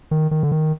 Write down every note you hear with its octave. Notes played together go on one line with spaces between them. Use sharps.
D#3
D#3
D3
D#3